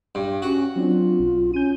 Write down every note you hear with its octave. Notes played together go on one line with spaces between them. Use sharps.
G2
C#4 F#4
F#3 C4 D4 F4
B1
C#4 G6 D#7